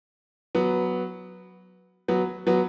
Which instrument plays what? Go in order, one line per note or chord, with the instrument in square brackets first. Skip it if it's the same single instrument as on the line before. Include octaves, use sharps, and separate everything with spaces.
[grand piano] F#3 B3
F#3 B3
F#3 B3